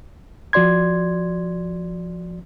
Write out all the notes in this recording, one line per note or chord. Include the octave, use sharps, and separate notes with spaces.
F3 F#4 D5 C6 G#6